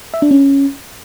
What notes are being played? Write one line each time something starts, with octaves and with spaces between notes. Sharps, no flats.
E5
D4
C#4